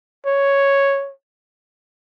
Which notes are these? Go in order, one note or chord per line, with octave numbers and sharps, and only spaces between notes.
C#5